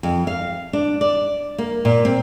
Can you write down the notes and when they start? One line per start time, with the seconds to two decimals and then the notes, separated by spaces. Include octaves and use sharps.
0.03 F2
0.27 F5
0.73 D4
1.01 D5
1.58 A#3
1.85 A#2
2.05 C4